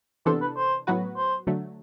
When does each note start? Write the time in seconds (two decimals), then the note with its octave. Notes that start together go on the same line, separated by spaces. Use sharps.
0.26 C3 E3 B3 D4 A4 C5
0.41 B4
0.56 C5
0.87 A2 F#3 B3 F#4 B4
1.17 C5
1.47 D3 F#3 A3